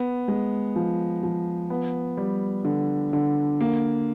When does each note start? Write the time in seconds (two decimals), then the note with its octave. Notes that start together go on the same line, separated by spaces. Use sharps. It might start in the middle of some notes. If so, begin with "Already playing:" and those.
Already playing: B3
0.28 G#3
0.76 F3
1.23 F3
1.70 B3
2.17 G3
2.65 D3
3.13 D3
3.61 A#3